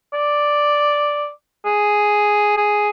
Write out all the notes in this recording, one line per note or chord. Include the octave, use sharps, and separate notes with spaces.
D5
G#4
G#4